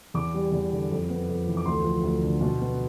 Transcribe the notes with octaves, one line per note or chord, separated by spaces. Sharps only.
E2 D6
G3
E2
D3
F2
B3
F2
E3
D6
D2 C6
F3
D2
D3
B2
B3